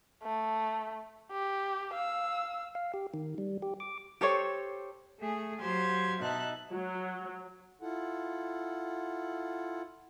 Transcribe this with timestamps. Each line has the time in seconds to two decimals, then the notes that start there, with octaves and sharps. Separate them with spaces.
0.23 A3
1.32 G4
1.94 F5 E6
2.75 F5
2.94 G4
3.14 D#3
3.38 G3
3.62 G4
3.80 D6
4.21 G4 A4 C5 C#5
5.20 A3 G#4
5.60 F#3 G4 C5 F5 C6 G#6
6.21 B2 D#4 E5 A5 F#6
6.71 F#3
7.81 E4 F4 A4 F#5